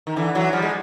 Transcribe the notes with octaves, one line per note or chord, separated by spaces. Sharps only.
D#3
D3 E3
E3 F#3
F3 G3
G#3